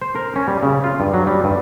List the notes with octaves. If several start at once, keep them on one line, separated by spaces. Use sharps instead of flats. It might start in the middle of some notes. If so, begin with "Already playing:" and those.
C5
A#4
C#4
G3
C#3
F4
G2
F#3
G3
G2